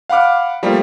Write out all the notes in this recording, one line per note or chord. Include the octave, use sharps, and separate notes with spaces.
F5 F#5 B5 D6 F6
F3 G3 A3 A#3